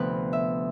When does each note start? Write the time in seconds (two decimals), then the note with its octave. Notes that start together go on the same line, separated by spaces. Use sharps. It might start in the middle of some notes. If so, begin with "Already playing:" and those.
Already playing: D2 C3 F3 B3 B4
0.33 E5